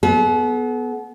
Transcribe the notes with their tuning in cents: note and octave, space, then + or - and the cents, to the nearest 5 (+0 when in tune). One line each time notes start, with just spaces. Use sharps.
B3 +0 A4 -45